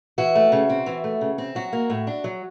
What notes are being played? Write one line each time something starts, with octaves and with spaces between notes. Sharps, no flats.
E3 F#4
A3
C#3
C4
E3
A3
C#3
C4
F#3 F#4
A#3
A2
D4
F#3